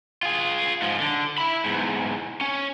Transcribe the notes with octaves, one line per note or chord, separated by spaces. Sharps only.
F4 G#4
G#2 F3
D3
E4 B5
E2 G#2
C#4